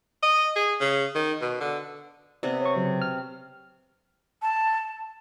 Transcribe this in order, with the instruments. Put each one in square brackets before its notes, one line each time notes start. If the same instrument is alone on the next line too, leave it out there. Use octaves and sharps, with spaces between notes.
[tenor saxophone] D#5
G#4
C#3
D#3
B2
D3
[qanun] C3 B3 [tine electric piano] D5
[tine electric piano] C#5 C#6
C#3 F#3
F6
[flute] A5